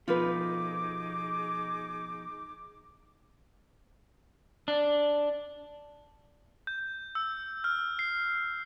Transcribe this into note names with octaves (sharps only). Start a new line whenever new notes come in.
B2 F3 A3 D#4 F4 G#4 B4 D6
D4
G6
E6
F6
C7